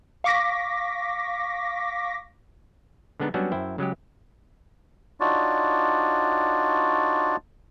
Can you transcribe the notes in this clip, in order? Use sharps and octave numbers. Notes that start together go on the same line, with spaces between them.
F5 C#6 D6 A#6 B6
D3 G#3 B3 D4 D#4
F#3 G3 B3 C#4 D4 F#4
F#2 E4 C5 G5
C#3 F#3 G#3 G4
D4 D#4 F4 F#4 C#5 D5